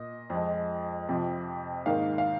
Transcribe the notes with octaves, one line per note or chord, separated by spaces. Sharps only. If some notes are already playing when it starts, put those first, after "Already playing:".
Already playing: A#2 D#5
F2 F3 G#3
F2 C3 F3
G#2 D#3 A#3 F5
F5